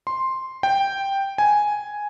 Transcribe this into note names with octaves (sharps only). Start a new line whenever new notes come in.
C6
G5
G#5